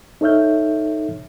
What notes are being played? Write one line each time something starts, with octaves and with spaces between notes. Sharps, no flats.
D#4 A4 C#5 E5 F6 G6